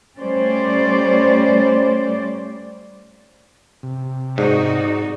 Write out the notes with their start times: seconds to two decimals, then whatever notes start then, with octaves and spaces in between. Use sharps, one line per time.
0.19 G3 A3 C#4 C5 D5
3.83 C3
4.38 G#2 D#4 F#4 D5